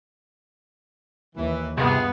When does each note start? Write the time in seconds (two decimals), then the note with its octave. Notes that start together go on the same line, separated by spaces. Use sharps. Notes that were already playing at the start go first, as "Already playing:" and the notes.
1.36 D#2 E3
1.78 G2 C3 B3 F4 G#4